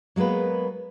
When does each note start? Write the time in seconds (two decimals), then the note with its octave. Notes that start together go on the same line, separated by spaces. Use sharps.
0.16 F#3 G#3 A#3 B3 B4